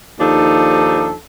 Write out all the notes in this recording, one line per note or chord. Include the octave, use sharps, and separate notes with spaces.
D#2 F3 D4 D#4 A4